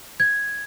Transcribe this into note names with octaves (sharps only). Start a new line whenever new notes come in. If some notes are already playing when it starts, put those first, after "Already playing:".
G#6